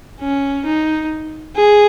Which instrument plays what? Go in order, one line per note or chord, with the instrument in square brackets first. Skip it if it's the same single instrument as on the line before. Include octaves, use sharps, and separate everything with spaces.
[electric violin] C#4
D#4
G#4